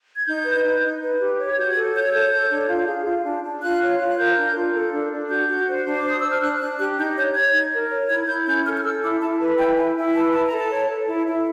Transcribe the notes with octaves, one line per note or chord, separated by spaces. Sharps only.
G#6
D#4 G6
B4
D#4
D#4
B4
G4
C#5
G#6
F#4 G6
G#6
A4
C#5 G6
G#6
A4 G6
C#5
D4
F4
G#4
F4
D4
D4
F4 F#6
C#5
F4
F#6
A#4 G6
D4
F4
A4
D4
D4
F#4 G6
F#4
C5
D4
D6
C5 D#6
C5 E6
F6
D4 F#6
D4 F#6
G4 F#6
D#4 G6
C#5 G6
C#5 G#6
D#4
A#4
C#5
E4 G#6
E4 G6
C#4 G6
A4 F6
F6
A4 E6
E4 D6
E4 A5
B4
E4 G5
E4 G#5
E4
B4 A5
E4 A5
A#5
A4
A5
C#5
A4
E4
E4